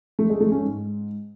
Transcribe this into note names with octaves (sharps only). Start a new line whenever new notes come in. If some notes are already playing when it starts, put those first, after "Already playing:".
A3
G#3
A3
C#4
G#2